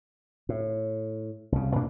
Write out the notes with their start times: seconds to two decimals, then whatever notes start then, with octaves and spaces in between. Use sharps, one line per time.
0.49 A2
1.52 C2 C#3
1.75 D2 A#2 A#3 D4